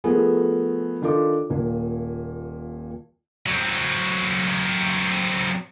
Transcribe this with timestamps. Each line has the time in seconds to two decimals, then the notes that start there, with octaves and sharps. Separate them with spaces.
0.04 F3 A3 B3 G#4 A#4
1.02 D#3 D4 F4 A4 D6
1.50 D#1 A#2
3.47 F#3 C4